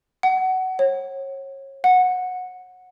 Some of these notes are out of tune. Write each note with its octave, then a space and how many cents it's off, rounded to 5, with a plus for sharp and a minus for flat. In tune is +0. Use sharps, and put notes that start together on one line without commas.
F#5 +20
C#5 -30
F#5 -15